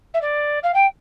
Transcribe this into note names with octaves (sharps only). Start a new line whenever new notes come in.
E5
D5
F5
G5